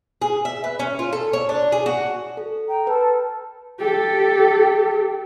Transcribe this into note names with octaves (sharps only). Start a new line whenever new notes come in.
G#4
E5
B4
C#4
F4
A4
C#5
D4
G#4
F#4
A4
G5 A#5
A4 B4 A5
G4 A4